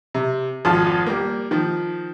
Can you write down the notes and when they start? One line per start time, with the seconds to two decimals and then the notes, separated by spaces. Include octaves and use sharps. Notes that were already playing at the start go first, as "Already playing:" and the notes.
0.15 C3
0.65 G#1 F2 F4 A5
1.06 G3 A#3
1.51 D#3 F3